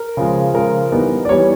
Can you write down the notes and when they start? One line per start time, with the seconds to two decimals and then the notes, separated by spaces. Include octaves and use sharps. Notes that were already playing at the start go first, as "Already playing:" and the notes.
Already playing: A#4
0.17 C#3 F3 G#3
0.54 C#3 F3 G#3 A#4
0.92 E3 G3 B3 D#4
1.25 D5
1.29 E3 G3 B3 D#4 C#5